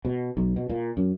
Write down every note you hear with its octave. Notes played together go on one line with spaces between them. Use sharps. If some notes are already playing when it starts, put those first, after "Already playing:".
B2
B1
B2
A#2
F#2